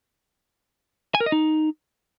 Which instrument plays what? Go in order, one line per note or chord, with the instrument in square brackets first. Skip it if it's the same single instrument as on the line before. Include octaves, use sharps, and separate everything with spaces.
[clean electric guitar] G#5
A#4
D#5
D#4